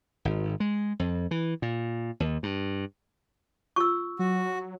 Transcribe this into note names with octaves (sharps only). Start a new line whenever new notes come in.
G#1
G#3
F2
E3
A#2
D#2
G2
F4 C#6 E6
F#3 F#4